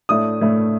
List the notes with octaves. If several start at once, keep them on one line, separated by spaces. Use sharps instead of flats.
A2 A3 D4 D#6
A2 A3 D4